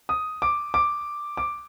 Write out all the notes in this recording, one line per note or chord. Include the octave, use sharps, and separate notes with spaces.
D#6
D6
D6
D6